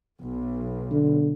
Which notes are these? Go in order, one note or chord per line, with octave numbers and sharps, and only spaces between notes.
B1
D3